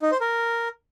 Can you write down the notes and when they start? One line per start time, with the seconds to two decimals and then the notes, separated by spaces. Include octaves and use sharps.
0.02 D#4
0.12 C5
0.21 A#4